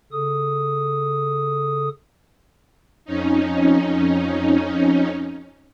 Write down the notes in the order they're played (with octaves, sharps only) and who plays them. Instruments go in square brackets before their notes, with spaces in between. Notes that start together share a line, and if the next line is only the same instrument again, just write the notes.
[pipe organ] C#3 A4 D#6
[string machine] F2 C#4 D#4